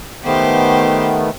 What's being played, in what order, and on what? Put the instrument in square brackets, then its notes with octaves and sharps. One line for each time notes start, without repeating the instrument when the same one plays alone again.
[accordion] D#3 A3 B3 [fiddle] G4 C5